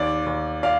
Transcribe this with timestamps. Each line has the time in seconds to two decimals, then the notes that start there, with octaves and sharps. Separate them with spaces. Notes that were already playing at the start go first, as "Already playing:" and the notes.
Already playing: D#2 D5
0.26 D#2
0.63 D5 F5